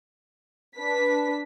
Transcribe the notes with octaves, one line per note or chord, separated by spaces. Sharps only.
D4 B4 B6